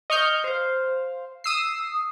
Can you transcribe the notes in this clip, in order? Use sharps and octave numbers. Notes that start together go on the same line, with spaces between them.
D#5 C#6 F6 G6
C5 F5
D#6 E6 C7